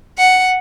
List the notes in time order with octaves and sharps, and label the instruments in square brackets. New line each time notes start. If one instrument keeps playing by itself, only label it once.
[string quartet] F#5